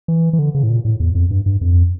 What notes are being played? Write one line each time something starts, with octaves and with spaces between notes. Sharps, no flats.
E3
E3
D3
C#3
A2
A#2
A2
E2
F2
G2
G2
F2